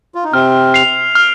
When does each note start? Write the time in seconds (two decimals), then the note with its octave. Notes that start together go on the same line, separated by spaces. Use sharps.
0.15 F4
0.24 D#4
0.33 C3 C4 F6
0.74 C7 F7
1.15 F6